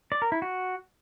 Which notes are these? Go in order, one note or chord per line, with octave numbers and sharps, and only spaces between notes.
D5
A#4
E4
F#4